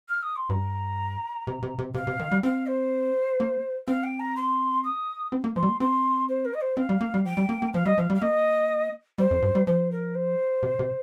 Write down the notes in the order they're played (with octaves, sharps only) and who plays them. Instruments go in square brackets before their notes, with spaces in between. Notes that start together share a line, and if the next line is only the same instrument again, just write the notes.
[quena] F6
D#6
C6
[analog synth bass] G2 [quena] A#5
[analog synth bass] C3
C3
C3
[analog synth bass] C3 [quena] F5
[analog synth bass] C3
D#3
G3
[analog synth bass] C4 [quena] F5
[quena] C5
[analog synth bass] A#3
[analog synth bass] C4 [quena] F5
[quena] G5
A#5
C6
D#6
[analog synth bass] C4
A#3
[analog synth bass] F3 [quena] C6
[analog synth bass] G3
A#3
[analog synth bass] C4 [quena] C6
[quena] C5
A#4
D#5
C5
[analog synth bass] C4 [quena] F5
[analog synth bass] G3
A#3
G3
[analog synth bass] F3 [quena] G5
[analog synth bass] G3
A#3
A#3
[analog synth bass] F3 [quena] F5
[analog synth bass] G3 [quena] D#5
[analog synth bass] F3 [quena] F5
[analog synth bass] G3
[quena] F5
[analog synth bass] A#3 [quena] D#5
[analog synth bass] G3 [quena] C5
[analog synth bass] F2
G2
G3
[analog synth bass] F3 [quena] C5
[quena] A#4
C5
[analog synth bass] C3
C3